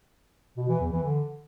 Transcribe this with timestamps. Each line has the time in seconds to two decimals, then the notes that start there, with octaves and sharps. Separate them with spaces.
0.57 B2
0.69 E3
0.80 E2
0.92 E3
1.04 D3